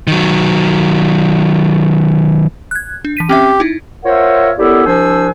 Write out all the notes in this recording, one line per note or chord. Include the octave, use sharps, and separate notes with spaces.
D#3 F#3
F#6 G#6
D4
E3 B6 D#7
C4 C#4 G4 E5
D#4 E4
F4 A#4 C5 C#5 E5 F#5
F#2 B3 E4 G4 A4 D5
C2 F3 D4 C5 G#5 E6